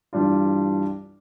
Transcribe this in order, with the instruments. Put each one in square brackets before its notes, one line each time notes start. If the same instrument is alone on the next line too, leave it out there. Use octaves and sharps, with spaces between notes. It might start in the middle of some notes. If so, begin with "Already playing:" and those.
[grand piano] G2 E3 G3 D4 F4